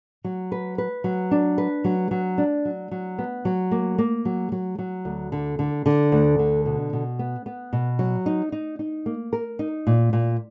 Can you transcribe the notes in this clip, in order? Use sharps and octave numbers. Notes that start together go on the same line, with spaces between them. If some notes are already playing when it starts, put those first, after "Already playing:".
F#3
B4
B4
F#3
D4
B4
F#3
F#3
D4
F#3
F#3
B3
F#3
A#3
A#3
F#3
F#3
F#3
D2
D3
D3
D3
D2
D3
B2
B2
B3
B3
B2
F#3
D#4
D#4
D#4
A#3
A#4
D#4
A#2
A#2